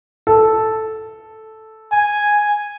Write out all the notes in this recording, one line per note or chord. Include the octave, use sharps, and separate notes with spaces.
A4
G#5